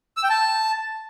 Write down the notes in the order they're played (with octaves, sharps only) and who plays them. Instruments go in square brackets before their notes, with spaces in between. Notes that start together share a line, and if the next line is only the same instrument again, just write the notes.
[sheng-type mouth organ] E6
G5
A5